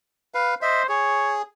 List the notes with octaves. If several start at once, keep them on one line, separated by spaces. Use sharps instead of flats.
B4 F5
C5 D#5 E5
G#4 C#5